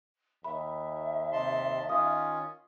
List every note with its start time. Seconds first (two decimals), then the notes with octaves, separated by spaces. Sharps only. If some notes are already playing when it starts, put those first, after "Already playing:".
0.44 D#2 E5 B5
1.33 C3 A5 C6
1.89 D#3 C#4 F4 F5 D#6